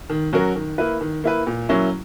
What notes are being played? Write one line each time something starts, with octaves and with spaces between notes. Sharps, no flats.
D#3
F#3 C#4 F#4 A#4
D#3
A#3 E4 B4
D#3
A#3 E4 B4
A#2
F#3 A#3 C#4 E4